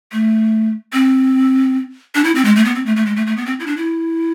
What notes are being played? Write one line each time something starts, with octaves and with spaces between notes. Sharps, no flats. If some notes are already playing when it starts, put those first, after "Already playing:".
A3
C4
D4
E4
C4
G#3
A3
B3
C4
A3
A3
G#3
A3
A3
B3
C4
E4
D4
E4